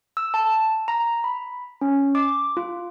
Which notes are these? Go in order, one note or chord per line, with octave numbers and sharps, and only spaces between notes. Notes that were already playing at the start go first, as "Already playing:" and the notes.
E6
A5
A#5
B5
C#4
D6
F4